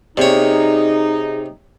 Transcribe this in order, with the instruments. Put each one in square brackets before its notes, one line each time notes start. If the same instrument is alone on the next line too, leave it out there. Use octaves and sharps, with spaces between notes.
[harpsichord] C3 C#5 [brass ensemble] D#4 [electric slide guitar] G#4 D5